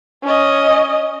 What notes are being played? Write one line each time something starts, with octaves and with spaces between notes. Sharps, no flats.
C#4 D#5